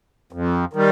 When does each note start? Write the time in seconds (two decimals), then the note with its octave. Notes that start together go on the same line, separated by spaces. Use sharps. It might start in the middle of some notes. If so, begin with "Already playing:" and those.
0.33 F2
0.73 D#3 G3